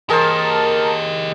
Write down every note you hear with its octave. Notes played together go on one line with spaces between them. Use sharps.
G4 G#4 A#4 C5 D#5 A5